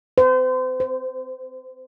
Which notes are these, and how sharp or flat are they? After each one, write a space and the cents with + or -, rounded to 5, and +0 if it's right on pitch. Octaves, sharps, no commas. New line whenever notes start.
C5 -35
C5 -10